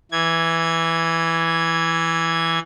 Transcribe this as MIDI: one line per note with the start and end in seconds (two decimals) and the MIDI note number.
0.11 2.59 52
0.11 2.59 92